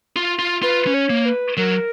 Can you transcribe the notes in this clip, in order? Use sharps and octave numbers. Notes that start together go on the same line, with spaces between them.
F4
F4
F4 B4
C#4
C#5
A#3
B4
F#3 A#4